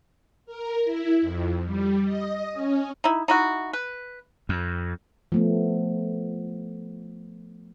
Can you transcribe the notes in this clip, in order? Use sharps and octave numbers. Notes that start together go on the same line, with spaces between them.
A#4
E4
F2
G3
D#5
C#4
D#4 E4
D#4 E4 F#4
B4
F2
F3 A3 B3